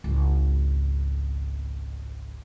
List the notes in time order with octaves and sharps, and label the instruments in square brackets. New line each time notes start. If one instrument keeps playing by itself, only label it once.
[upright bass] G#1 C#2